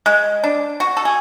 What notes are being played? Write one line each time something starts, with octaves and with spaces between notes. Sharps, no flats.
G#3
D4
F#4
A4
G#4